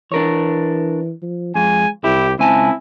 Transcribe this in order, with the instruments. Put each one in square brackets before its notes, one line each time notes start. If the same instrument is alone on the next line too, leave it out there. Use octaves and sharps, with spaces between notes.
[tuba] E3 [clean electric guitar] D4 A#4 C#5
[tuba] F3
[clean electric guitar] F2 [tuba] G#3 [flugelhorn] G#5
[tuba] C2 [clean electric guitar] E4 [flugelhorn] G4
[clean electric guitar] C#2 G#5 A5 [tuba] C4 [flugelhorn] E4